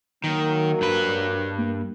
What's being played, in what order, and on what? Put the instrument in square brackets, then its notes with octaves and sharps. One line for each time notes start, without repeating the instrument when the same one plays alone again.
[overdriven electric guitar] D#3 [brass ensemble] F#3 A#3
[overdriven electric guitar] G2 B4
[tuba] A#3